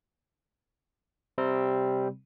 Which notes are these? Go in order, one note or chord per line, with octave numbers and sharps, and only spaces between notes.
C3 G3 C4